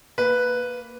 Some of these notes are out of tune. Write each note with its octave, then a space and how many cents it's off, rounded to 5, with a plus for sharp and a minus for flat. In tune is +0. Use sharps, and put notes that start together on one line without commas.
A#3 +0 B4 +0